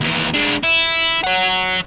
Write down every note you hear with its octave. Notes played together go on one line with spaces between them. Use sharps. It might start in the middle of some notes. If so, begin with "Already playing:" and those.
D#2 E3
G#3 D4
E4
C#5 F#5